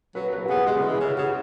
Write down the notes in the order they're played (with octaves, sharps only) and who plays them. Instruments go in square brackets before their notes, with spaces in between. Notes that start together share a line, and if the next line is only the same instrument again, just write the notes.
[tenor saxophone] F#3 [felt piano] B4
[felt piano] B4
F#4
[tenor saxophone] B3 [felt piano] G#4
[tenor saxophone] G#3 [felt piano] G#4
[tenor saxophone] C#3
E3
[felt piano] G#4
[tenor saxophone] C#3
[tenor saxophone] C#3 [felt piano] F#4